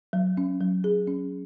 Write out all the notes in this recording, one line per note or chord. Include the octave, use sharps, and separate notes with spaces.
F#3
C#4
F#3
G#4
C#4